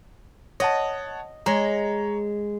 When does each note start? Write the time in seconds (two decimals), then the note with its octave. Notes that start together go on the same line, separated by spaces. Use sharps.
0.60 C#5 D#5 F#5 A5
1.46 G#3 C#5 A#5